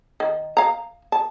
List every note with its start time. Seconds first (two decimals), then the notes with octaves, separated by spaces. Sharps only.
0.20 D#3
0.57 F5 A#5
1.12 A5